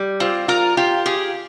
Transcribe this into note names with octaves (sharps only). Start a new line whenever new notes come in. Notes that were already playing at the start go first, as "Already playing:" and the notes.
Already playing: G3
C4 F4
F4 A#4
F4 G4
G4 G#4